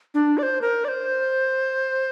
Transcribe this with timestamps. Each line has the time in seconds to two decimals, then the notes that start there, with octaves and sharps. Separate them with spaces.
0.14 D4
0.38 D5
0.43 C5
0.61 A#4
0.85 D5
0.88 C5